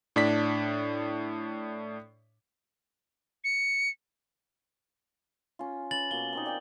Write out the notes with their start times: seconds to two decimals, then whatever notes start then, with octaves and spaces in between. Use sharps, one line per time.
0.16 A2 D4 D5 B6
3.44 C#7
5.59 C#4 F4
5.91 C#4 B4 A6 F#7
6.11 B2 A#3 C#6 G7
6.33 A#3 C4 D#4
6.46 D5 G5 G#5